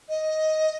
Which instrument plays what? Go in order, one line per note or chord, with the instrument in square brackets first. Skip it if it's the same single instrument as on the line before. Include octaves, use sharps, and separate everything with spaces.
[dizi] D#5